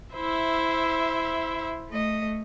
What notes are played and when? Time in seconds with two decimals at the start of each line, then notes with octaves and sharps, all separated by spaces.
0.15 E4 C5 E5
1.89 A3 D#5